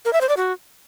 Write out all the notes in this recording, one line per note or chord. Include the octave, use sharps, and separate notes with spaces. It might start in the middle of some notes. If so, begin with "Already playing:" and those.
A#4
E5
C5
D5
F#4